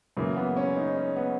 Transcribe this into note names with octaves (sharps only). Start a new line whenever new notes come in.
F#2 C#3 E3 A#3
B3
C#4
D#4
C#4
B3